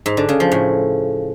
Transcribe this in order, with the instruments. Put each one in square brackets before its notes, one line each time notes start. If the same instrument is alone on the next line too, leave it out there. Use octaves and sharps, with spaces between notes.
[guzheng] G#2
D3
C#3
F3
A2